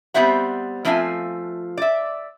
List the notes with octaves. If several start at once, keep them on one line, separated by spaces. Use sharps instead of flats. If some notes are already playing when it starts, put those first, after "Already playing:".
G3 B3 C4 C5 E5 F#5
F3 A3 C4 F4 E5 G#5
D5 E5